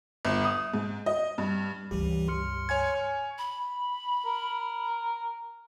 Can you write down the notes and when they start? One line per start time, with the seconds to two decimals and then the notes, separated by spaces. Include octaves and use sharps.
0.25 G1
0.44 D#6
0.74 G#2
1.06 D#5
1.38 G2
1.91 C#2 G2 E3 G3 G4
2.28 C6 F6 C#7
2.69 C#5 G#5 G#6
3.38 B5
4.25 A#4